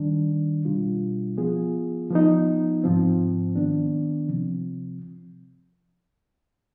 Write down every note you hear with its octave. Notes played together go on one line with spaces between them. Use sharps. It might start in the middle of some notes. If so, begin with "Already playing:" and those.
Already playing: D#3 G3 D4
B2 G3 D4 F4
F3 B3 F4 G#4
F3 B3 D#4
G#2 F3 C4
D#3 B3 D4
C3 F3 C4